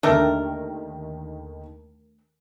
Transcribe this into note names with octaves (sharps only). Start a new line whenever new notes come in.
D#2 D3 D#3 A3 D4 A#4